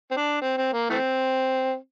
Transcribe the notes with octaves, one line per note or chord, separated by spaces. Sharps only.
C4
D4
C4
C4
A#3
E3 A3 C4